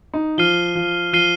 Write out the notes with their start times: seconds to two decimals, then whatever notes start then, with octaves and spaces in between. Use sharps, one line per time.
0.14 D#4
0.38 F3 F6 C7 D#7 G7
0.75 F3
1.13 F3 F6 C7 D#7 G7